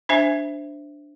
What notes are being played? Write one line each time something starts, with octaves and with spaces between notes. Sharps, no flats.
D4 C5 E5 G#5